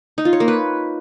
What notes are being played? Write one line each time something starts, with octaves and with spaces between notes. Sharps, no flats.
D#4
F4
C#5
A#3
B4